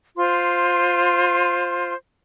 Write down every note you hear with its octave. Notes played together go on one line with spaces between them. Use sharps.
F4 C5 C6